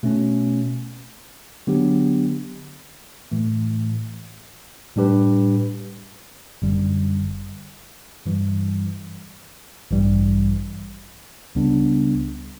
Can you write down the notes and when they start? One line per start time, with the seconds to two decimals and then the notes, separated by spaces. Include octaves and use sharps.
0.03 B2 A3 C#4
1.67 D3 F#3 B3 D4 G4
3.32 A2 E3 A3
4.96 A2 G3 D4 G4 B4
6.62 G1 F#2 D3 G3
8.26 G2 E3 G3
9.91 A1 G2 E3 G3
11.55 C#2 C#3 G3 B3 D4